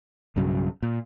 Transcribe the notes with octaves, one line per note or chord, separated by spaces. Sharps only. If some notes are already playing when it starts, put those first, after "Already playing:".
B1 G2 C#3 F#3
A#2